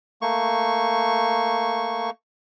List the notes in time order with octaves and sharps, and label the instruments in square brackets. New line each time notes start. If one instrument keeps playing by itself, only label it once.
[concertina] A3 A#3 C#6